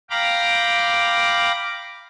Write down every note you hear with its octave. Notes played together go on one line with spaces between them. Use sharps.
F5 G5 A#5 B5 D6